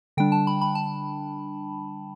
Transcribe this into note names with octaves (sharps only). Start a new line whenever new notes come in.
D3 G3 D4 G5
A5
B5
B5
A5